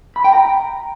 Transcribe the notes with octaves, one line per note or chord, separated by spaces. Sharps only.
B5
G5
A#5